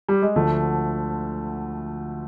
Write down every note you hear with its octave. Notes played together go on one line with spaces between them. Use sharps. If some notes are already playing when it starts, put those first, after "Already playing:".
G3
G#3
D2 D3 F3 A3